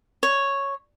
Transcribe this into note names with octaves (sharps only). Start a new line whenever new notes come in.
C#5